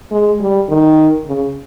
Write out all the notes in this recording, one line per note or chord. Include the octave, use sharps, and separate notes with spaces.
G#3
G3
D#3
C#3